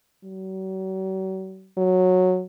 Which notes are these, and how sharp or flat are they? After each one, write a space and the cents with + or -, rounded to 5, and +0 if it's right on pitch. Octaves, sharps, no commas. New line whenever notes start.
F#3 +40
F#3 -10